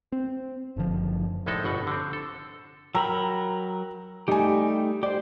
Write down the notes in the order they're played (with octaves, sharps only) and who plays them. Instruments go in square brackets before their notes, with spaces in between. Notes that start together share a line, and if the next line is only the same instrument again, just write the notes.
[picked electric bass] C4
F#1 D3 F3
[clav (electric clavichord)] C2 A2 G#3 D#4 A4
G1 B2 F#5
D3 C4
A4
[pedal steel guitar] F#3 A#4 B5 [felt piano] G5 A#5 E6
[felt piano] G3 G#5 [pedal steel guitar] A3 D#4 G4
[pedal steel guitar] G4 C5 [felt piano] D5